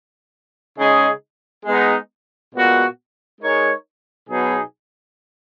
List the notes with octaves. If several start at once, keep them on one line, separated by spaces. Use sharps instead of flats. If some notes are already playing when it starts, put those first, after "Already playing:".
C#3 G#3 D#4 G#4
G#3 B3 D#4
A#2 G#3 B3 F#4
G#3 D#4 A#4 C#5
B2 F#3 B3 D#4 G#4